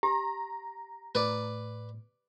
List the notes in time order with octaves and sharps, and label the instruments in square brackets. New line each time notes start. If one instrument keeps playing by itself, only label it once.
[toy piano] G4 [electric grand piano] A#5
[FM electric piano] A2 [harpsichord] B4 D5